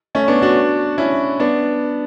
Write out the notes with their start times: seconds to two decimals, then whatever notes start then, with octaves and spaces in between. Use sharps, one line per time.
0.15 A3 C#4
0.28 B3 D4
0.42 D4 F#4
0.98 C#4 E4
1.40 B3 D4